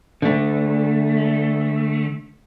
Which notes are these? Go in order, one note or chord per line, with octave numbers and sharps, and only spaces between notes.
D3 A3